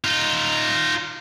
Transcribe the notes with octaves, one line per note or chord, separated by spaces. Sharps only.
D#4 F4